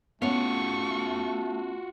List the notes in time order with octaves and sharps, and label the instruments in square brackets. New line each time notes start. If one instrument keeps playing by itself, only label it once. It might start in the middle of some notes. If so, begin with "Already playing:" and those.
[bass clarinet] A3 [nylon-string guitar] B3 C#4 [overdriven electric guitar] F4 F#4 [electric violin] C#6